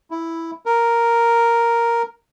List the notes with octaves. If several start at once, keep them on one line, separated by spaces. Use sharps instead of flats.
E4
A#4